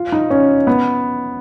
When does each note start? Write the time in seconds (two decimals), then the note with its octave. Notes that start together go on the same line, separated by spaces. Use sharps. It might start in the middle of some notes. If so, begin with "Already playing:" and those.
Already playing: F4
0.12 D#4
0.30 C#4
0.67 B3